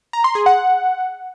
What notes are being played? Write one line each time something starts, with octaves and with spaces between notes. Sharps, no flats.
A#5
C6
G#4
F#5